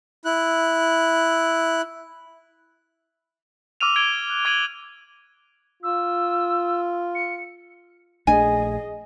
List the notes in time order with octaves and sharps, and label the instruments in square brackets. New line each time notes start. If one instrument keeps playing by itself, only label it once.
[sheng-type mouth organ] E4 F#6
[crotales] D6 E6 F6 D#7 F7
G#6 D7 G7
F#6
D6 G#6 D7 D#7 F#7 G7
[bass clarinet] F4 [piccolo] E6
[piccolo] C#7
[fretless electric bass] A#1 A3 D4 [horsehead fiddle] G#4 D#5 [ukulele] G#5